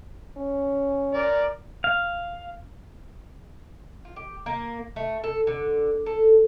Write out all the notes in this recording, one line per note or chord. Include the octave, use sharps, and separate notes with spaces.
C#4
A#4 D5
F5
F4
G4
A#3
A3
A4
D3
A4